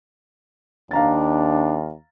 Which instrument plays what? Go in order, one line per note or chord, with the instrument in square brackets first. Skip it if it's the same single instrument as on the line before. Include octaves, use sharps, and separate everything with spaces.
[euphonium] D#2 [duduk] D4 [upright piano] F5 A#5 A6